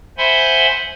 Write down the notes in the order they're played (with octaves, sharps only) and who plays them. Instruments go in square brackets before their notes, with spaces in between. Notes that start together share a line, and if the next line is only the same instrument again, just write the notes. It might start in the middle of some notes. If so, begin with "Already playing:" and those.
[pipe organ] C5 E5 F#5 G#5 B5 C6